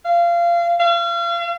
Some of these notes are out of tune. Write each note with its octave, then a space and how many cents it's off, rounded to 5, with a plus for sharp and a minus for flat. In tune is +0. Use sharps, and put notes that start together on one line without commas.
F5 -25
F5 -35